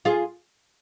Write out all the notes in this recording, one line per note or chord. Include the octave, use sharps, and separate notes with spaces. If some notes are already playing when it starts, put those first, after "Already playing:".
F4 G#4